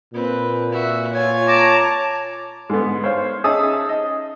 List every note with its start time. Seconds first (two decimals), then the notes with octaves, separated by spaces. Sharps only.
0.14 A#2 C4 B4
0.72 F#4 E5
1.13 F4 C#5 G#5
1.48 A5 A#5 D6
2.70 G#2 D3 B3
3.04 C5 C#5 F5
3.44 C#4 D#4 G#4 E5 A5 D#6
3.89 D#5